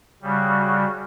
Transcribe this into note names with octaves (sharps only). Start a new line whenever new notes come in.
C#3 G3 F#4